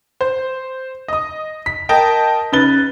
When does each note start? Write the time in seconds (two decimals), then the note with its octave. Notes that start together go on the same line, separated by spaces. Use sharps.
0.21 C5
1.08 D#5 D#6
1.66 B6
1.89 A#4 D#5 G5 A5
2.52 C#3 D#4 B4 A6 G7